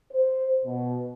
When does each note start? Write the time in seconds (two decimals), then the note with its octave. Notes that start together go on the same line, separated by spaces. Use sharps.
0.12 C5
0.65 B2